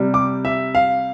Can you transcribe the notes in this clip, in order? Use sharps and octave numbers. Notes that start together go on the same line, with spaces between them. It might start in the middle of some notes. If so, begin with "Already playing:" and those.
Already playing: C3 G3
D6
E5
F5